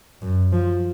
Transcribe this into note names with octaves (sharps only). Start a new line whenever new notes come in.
F#2
F3